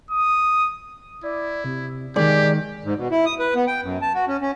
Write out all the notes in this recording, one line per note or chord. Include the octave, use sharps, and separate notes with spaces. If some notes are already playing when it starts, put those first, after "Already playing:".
D#6
E4 D5
C3
D#3 G#3 G4 G#4 D5
G#2
B2
E4
D#6
B4
B3
G5
F#2
A5
F#4
C#4
C#4